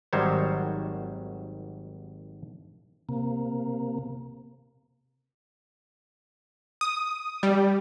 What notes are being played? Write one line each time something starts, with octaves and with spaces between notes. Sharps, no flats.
G#1 D#3 F#3 G3 C5 C#5
C3 A#3
D#6
G3